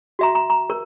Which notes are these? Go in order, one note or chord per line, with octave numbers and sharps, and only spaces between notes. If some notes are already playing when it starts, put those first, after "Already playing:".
F#4 E5 A#5
A#5
A#5
A#4